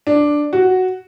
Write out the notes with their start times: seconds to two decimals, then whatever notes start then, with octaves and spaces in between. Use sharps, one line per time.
0.07 D4
0.53 F#4